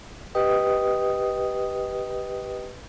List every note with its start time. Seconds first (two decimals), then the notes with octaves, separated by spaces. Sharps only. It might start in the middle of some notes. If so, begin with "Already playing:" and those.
0.35 G4 B4 D#5 G5 D#6